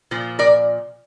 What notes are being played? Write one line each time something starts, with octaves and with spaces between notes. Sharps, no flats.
A#2 F3
A#4 D5